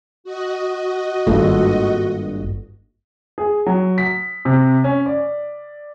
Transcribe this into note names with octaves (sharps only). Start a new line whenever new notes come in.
F#4 D#5
G#1 G2 A#3 F4 A4
G#4
F#3
B6
C3
C#4
D5